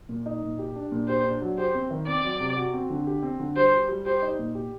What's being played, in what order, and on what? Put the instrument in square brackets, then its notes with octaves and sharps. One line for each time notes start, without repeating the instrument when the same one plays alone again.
[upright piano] A#2
D#4
A#2
G4
D4
A#2
[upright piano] G4 [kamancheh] C5
[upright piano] D4
F#3
[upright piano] G4 [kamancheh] C5
[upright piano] C4
D#3
[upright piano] C4 [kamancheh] D5
[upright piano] F#3
C3
F#4
C4
D3
G4
C4
D3
[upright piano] G3 [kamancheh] C5
[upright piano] G4
G3
[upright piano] G4 [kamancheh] C5
[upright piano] D#4
A#2
G4